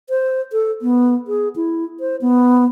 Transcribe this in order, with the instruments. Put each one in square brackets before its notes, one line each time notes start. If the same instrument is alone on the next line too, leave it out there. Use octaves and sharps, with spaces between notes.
[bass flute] C5
A4
B3
G#4
E4
C5
B3